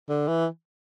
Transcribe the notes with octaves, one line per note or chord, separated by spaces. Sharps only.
D3
E3